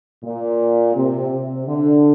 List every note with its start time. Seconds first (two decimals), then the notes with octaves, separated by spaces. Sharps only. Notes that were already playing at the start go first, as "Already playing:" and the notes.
0.24 A#2
0.95 C3
1.31 C3
1.66 D3